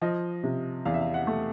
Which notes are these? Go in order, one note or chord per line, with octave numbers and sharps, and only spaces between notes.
F3 D#5
C3
E2 F5
E5
F5
F#5
A3